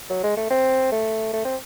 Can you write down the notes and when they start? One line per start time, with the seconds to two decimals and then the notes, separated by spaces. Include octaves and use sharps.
0.10 F#3
0.24 G#3
0.37 A3
0.51 C4
0.92 A3
1.34 A3
1.45 C4